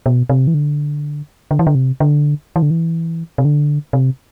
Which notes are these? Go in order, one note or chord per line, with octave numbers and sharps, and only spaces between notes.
B2
C3
E3
D3
D3
E3
D3
C3
D3
E3
D3
E3
C3
D3
C3